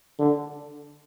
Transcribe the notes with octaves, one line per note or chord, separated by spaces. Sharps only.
D3